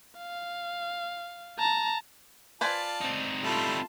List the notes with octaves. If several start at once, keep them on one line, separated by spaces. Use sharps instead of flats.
F5
A5 A#5
F4 B4 C5 D5 G#5 A5
C4 D#4
G3 A3 E4 F4 A5